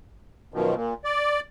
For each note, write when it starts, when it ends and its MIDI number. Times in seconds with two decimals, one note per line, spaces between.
0.54 0.75 42
0.54 0.75 47
0.54 0.75 51
0.54 0.75 53
0.75 0.94 46
1.04 1.40 74